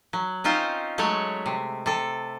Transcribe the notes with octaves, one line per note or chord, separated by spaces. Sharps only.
F#3
C4 C#4 D#4 F4 C5
F#3 G#3 A3 C#5
C3
C3 A4